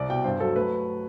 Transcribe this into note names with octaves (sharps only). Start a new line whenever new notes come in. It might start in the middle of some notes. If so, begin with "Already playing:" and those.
Already playing: C2 D5
B2 G5
G2 C5
F#3 A4
A3 B4